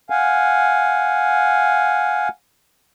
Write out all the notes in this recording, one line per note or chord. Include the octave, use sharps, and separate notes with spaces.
F5 F#5 G#5